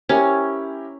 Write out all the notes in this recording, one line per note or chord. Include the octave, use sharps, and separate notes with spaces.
C#4 E4 G4 A#4